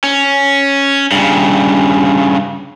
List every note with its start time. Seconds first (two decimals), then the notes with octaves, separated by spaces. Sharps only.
0.04 C#4
1.12 G2 C#3